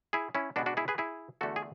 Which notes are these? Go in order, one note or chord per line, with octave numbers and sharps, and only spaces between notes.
E4 G#4
C#4 E4
B2 G#3 B3 D4 F#4
D4 F#4
E4 G#4
G#4 B4
E4 G#4
E2 D3 A3 F#4 A4
G#4